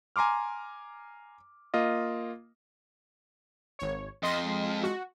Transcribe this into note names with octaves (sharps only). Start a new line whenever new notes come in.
G#5 A#5 C6 D6 F6
A#3 F4 D#5
G#1 C#5
F2 D#5 C6
G#3
F#4